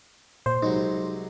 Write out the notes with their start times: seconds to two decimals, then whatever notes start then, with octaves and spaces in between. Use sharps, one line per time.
0.46 A#2 C5
0.63 C2 F#3 G#3 D#4